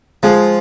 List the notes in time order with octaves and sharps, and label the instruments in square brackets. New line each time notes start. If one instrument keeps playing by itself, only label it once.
[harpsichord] F3 [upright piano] G#3 G#4